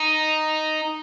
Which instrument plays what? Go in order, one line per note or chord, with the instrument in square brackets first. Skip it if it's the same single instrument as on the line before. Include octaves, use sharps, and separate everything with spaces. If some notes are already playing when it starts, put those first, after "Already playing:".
Already playing: [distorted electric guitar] D#4